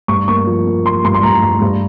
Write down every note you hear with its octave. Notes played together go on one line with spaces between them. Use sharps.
G2 C#6
A#3 C#6
F3
A#3
F3 C6
G2 C6
C6
G2 A#5
G2
G2